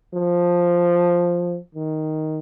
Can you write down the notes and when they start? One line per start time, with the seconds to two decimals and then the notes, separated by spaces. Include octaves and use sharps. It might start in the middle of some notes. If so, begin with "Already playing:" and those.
0.14 F3
1.75 D#3